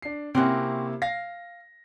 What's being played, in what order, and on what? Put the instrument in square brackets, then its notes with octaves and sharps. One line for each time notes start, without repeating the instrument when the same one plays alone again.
[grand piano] D4 C7
[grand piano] C3 A#3 E4 [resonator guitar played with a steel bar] C4 C#4 F#4
[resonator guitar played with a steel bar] F5 [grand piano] A#6